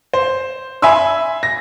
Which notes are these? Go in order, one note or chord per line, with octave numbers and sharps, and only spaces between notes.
C5
E5 G#5 B5 C6 E6
A#6